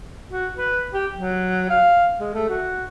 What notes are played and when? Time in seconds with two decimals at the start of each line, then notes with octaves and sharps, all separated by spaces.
0.30 F#4
0.57 B4
0.93 G4
1.14 F#3
1.70 F5
2.20 G#3
2.34 A3
2.50 F#4